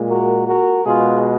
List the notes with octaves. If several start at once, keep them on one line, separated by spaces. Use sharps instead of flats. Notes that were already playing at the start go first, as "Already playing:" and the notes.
Already playing: A#2 G#3
F#4 A#4
F#4 A#4
B2 G#3 F4 G#4